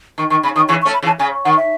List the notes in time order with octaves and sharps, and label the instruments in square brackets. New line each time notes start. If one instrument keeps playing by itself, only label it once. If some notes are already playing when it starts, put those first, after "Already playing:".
[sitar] D#3 [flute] C#6
[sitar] D#3 [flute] C#6
[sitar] C#3 [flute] B5
[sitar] D#3 [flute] D#6
[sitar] C#3 E3 [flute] C#6
[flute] C#6
[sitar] A3 C#4
[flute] B5
[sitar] C#3 E3
[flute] A5
[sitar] C#3 [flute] G#5
[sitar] D#3 [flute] F#5
[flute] E5